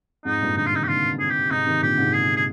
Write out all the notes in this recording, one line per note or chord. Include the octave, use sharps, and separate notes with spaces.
F2 G#2 D#4
G2 A#2
A#2 D3 D#4
F4
C3 D#3 D#4
G4
A#2 D3 F4
G#4
G4
G#2 C3 D#4
C3 D#3
A#2 D3 G4
G#2 C3
G#4
G#4